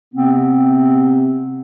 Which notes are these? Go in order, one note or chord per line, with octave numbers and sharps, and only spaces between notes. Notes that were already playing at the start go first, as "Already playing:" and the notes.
C3 B3 C4